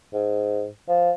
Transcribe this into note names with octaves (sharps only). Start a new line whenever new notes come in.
G#2
F3